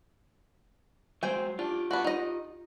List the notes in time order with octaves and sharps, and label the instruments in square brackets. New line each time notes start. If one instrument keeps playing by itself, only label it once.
[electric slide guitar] F#3 G#3 C5 [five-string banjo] C4 G5 G#5
[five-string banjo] D4 [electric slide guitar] F4 G4
[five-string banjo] B3 D4 F#4
D#4 D#5